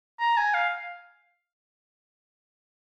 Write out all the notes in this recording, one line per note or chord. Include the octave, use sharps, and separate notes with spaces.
A#5
G#5
F5